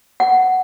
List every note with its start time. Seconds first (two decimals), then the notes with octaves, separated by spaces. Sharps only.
0.20 F#5